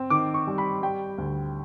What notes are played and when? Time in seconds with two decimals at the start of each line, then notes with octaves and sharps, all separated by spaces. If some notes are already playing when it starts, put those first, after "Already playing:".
Already playing: C4
0.10 D#3 D6
0.34 C#6
0.47 G3
0.58 B5
0.82 G3 G5
1.18 D2